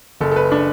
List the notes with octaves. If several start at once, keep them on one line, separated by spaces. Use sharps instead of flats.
F#1 A4
A4
B4
D4